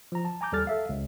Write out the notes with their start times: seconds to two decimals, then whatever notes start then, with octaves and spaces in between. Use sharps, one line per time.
0.12 F3 A#5
0.25 A5
0.41 G#5 A#5 D6 G6
0.52 D#2 G3 A4 F6 A6
0.67 A4 E5 F5
0.89 C#2